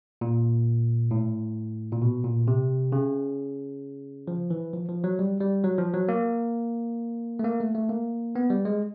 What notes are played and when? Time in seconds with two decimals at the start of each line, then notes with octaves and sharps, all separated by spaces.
0.21 A#2
1.11 A2
1.92 A#2
2.02 B2
2.24 A#2
2.48 C3
2.92 C#3
4.28 F3
4.50 E3
4.73 F3
4.89 F3
5.04 F#3
5.19 G3
5.41 G3
5.64 F#3
5.78 F3
5.94 F#3
6.09 A#3
7.39 A3
7.44 A#3
7.60 A3
7.75 A3
7.90 A#3
8.36 B3
8.50 G3
8.65 G#3